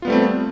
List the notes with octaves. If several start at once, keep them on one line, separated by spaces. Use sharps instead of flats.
G3 A3 B3 C4 F4